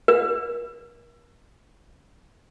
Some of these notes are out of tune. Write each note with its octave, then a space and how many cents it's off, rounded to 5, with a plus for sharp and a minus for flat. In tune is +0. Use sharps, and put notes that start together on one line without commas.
A#4 +30